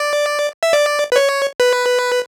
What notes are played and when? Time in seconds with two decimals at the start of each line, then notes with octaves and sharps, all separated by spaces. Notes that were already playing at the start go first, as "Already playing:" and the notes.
Already playing: D5
0.63 E5
0.73 D5
1.12 B4
1.16 C#5
1.60 B4